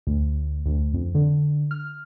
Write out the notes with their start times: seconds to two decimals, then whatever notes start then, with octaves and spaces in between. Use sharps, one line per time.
0.07 D2
0.66 D2
0.94 F2
1.15 D3
1.71 F6